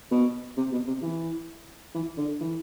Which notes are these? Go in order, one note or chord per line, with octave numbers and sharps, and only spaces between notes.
B2
C3
B2
C3
E3
E3
D3
E3